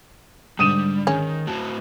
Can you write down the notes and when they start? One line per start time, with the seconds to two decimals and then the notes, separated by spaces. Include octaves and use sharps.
0.59 G#2 D3 G3 D#6 D#7 E7
1.07 D#3 G#3 C#4
1.47 A2 F#4 A5